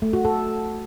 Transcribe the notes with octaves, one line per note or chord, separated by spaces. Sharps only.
A3
F#4
A4